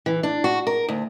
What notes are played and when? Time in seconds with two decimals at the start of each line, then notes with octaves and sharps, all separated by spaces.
0.06 E3
0.23 D4
0.44 F#4
0.67 A#4
0.89 D2